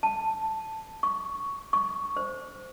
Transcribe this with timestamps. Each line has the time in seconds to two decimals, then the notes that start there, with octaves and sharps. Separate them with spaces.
0.03 A5
1.03 C#6
1.73 C#6
2.17 C5